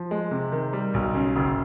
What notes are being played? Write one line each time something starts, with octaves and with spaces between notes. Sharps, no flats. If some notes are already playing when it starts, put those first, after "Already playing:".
Already playing: F3
G#3
C3
D#3
G3
B1
C#3
F#1